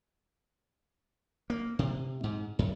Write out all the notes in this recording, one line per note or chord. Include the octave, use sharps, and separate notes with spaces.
A#3
C3
G#2
F#2